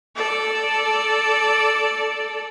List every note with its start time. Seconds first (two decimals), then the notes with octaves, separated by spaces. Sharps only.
0.15 A4 D5